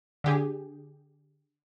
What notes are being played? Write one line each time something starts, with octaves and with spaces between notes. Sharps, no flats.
D3 G4 G#4